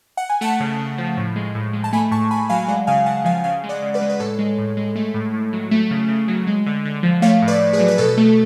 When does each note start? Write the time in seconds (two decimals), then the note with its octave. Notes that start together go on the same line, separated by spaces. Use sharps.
0.17 F#5
0.29 G#5
0.41 A3 F#5 A5
0.60 C#3
0.79 C#3
0.98 F3
1.17 A2
1.36 G#3
1.55 A2
1.73 G#3
1.84 A5
1.93 A3 G#5 B5
2.11 A2 A5 C#6
2.30 A2 G#5 B5
2.49 F#3 F5 G#5
2.68 G#3 D5 F#5
2.87 C#3 F5 G#5
3.06 C#3 F#5 A5
3.25 F3 F5 G#5
3.44 C#3 F5 G#5
3.64 G#3
3.69 D5 F#5
3.82 C#3
3.94 B4 D5
4.01 G#3
4.10 B4
4.19 A2 A4 C#5
4.39 G#3
4.58 A2
4.77 G#3
4.95 A3
5.14 A2
5.34 A2
5.53 F#3
5.71 A3
5.91 C#3
6.09 C#3
6.28 F#3
6.47 G#3
6.66 D3
6.85 D3
7.03 F3
7.22 A3 C#5 F5
7.42 A2
7.48 B4 D5
7.61 A2
7.73 G#4 B4
7.79 F#3
7.88 B4
7.98 B2 A4
8.17 A3